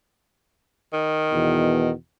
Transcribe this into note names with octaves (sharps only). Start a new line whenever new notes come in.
D#3
E2 B2